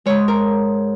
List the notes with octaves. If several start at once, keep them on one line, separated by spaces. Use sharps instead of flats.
G#2 G#3 C#5
A#4